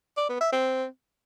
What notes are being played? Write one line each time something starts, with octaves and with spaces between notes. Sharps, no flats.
D5
B3
E5
C4